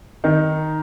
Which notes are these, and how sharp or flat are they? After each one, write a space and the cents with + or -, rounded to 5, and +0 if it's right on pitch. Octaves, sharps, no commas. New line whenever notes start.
D#3 +0 D#4 +0